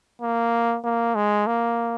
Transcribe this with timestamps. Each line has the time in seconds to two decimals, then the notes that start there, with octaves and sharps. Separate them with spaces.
0.21 A#3
0.84 A#3
1.15 G#3
1.47 A#3